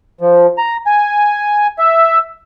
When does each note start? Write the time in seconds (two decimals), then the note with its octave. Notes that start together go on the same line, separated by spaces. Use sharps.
0.21 F3
0.58 A#5
0.86 G#5
1.79 E5